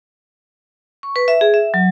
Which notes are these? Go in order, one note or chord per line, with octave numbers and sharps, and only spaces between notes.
C#6
B4
E5
G#4
E5
F#3